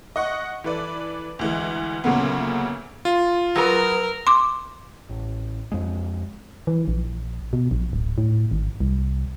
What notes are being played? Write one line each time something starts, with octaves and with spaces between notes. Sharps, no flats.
D#5 F#5 C#6
E3 A4 B4 D5
D2 E3 G#3
D2 A#2 C#3 F#3 A3 B3
F4
F#3 G#4 A#4 B4 A#5
C6 D6
A1
F2 G#3
E3
A#1
B2
A#1
D1
A2
G#1
C2